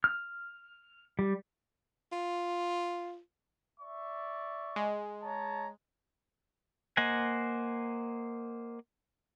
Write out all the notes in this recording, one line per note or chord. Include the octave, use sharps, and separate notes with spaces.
F6
G3
F4
D5 E5 C#6
G#3
C#5 A5 A#5
A#3 C5 D#5 F#5 G#5